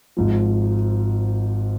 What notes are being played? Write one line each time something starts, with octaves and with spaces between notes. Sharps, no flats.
G#1 G#2 F3